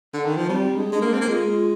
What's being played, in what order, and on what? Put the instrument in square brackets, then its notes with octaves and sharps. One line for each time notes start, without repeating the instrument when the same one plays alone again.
[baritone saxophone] D3
D#3
F3
[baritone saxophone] G3 [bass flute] C4
[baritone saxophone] G#3 [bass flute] D4
[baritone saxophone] G#3
[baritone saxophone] A#3 [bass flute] D4
[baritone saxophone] C4
A#3
[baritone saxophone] G#3 [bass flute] F4